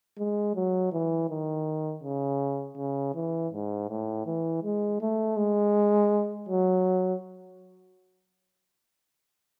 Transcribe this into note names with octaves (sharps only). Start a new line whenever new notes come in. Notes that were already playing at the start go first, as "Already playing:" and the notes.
G#3
F#3
E3
D#3
C#3
C#3
E3
G#2
A2
E3
G#3
A3
G#3
F#3